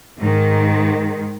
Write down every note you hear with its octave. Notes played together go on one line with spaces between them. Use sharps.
G#2 D#3 G#3